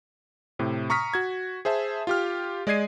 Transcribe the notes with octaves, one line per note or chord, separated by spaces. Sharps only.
A2 C3
A#5 C#6 D#6 F6 B6
F#4 G#6
G#4 C5 E5 A5
F4 G4 F6
G#3 D5 D#5 G#6 C7 D#7